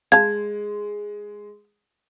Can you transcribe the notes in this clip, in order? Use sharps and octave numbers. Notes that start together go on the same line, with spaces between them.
G#3 F5 A5 G#6